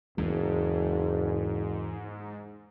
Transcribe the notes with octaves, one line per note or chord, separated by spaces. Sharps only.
F#1 E2 G#2